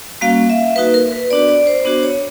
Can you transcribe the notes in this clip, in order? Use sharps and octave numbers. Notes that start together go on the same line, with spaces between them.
G3 A#3 C#4 F#4 F5
E5
A#3 D#4 F#4 B4
A#4
B4
B3 D4 F#4 D5
D5
C5
B3 D4 F#4 C5
C#5